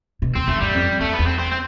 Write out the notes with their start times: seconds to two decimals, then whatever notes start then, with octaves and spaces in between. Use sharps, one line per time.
0.22 B2
0.35 E2 C4
0.48 F2 A3
0.61 G2 G3
0.74 F2
1.00 F2 A3
1.13 B3
1.19 E2
1.26 C4
1.39 C4
1.52 C4